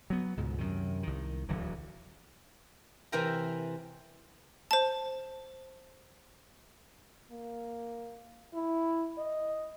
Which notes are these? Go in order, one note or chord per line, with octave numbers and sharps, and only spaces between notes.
F#3 B3
C#2 G#2 B2
F#2 C3 D#3
C2 D#3
D1 D3 E3 F#3
C3 E3 A#4 G5 A#5
C5 A5
A#3
E4
D#5